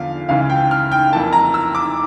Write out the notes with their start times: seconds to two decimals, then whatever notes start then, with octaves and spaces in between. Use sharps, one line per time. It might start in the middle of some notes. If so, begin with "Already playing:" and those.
Already playing: E2 D3 F3 F5
0.29 C#2 C#3 E3 F5
0.50 G5
0.71 F6
0.92 G5
1.12 F2 E3 A#3 A5
1.33 A#5
1.54 E6
1.75 D6